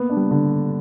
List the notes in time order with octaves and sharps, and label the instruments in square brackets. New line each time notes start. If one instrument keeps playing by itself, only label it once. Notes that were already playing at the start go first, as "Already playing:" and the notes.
Already playing: [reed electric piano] A#3 [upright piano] B3
[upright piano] D4
[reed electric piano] G3
[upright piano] D3